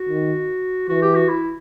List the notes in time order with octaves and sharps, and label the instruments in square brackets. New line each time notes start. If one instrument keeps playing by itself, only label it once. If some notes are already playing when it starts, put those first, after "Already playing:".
Already playing: [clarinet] F#4
[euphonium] D#3
[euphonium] E3 [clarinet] F#4
[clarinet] G4
F#4
E4